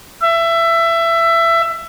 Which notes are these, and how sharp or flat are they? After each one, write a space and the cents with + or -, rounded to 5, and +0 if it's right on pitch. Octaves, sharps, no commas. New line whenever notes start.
E5 +20